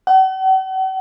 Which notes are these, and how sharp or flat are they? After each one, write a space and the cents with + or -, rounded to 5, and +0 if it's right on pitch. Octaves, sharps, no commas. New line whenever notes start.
F#5 +45